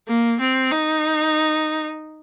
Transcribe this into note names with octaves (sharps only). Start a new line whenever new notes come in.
A#3
C4
D#4